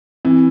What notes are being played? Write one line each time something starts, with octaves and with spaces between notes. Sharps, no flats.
E3 C4